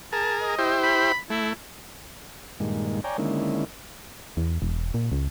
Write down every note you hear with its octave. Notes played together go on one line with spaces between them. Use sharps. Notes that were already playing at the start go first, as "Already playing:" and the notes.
G#4 A#4 A5
D#5
E4 G4 C5
B5
A3 E4
G2 A#2 D#3 G#3
C#5 D5 G5 G#5 A#5
D3 D#3 G#3 A#3 C#4 E4
E2
E1
A#2
C#2